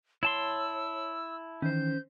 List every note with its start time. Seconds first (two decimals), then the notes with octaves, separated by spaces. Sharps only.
0.23 E4 C#5 A5 C6 E6
1.62 D#3 E3 C#4 C5 G6